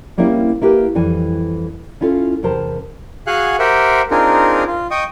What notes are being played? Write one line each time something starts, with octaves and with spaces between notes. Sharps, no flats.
G3 A#3 C4 C#4 E4 G#4
A#3 E4 G4 A#4 B4
F2 E3 G3 G#5
C#4 E4 F4 A4 F5
E2 C3 A#4 C5 A5
F#4 G#4 F5 F#5 G#5 F#6
G4 A#4 C5 E5 F#5 G5
C4 D4 D#4 F4 G#4 A#4
F4
D#5 G5 C#6 D#6